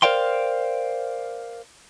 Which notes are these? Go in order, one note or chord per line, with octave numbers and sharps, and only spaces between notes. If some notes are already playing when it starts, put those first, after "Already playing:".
A#4 C5 D5 F5 G5 C6